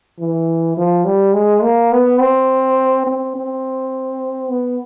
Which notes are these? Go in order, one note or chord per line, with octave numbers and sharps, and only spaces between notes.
E3
F3
G3
G#3
A#3
B3
C4
C4
C4
B3